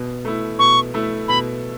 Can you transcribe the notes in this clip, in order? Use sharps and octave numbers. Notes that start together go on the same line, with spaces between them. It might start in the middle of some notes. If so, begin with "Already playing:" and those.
Already playing: B2
A3 E4
B2 C#6
A3 E4
B2 B5